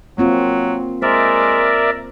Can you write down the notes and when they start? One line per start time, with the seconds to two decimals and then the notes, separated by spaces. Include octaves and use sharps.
0.18 F#3 A#3 C4 F4
1.02 G#3 A#4 C5 D5 E5